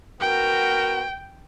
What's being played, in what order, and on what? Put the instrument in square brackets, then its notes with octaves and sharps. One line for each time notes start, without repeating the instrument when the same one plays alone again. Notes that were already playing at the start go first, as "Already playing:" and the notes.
[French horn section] B3 F#4 A#4 [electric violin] G5